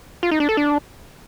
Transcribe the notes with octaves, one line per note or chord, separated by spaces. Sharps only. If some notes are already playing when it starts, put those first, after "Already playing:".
F4
D#4
D4
A4
D4